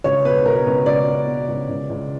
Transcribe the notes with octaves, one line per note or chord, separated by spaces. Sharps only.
C#2 C#5
B2 B4
B2 A#4
C#2 B4
C#2 D5
B2
B2
C#2
C#2
C#2